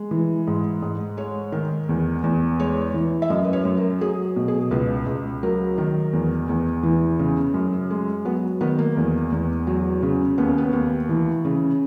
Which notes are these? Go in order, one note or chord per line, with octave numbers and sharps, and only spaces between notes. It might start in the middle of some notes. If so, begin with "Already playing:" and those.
Already playing: G#3
E3
G#2
G#2
G#3 C#5
D#3
E2
E2
G#3 C#5
E3
E5
F#2 D#5
B4
C#5
F#2
A#4
F#3 G#4
B2
G#4
C#2 B4
C#2
F#3 A#4
D#3
E2
E2
E3
C#3
F#2
G#3
F#3 B3
D#3 B3
A#3
E2
E2
F#3
C#3
D#2 B3
C#4
B3
D#2
E3
C#3